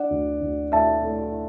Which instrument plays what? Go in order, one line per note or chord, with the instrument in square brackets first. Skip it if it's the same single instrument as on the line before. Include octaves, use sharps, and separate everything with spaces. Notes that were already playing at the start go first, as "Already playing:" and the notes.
Already playing: [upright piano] D4 D5 F#5
D2
D2
A3 E5 A5
A3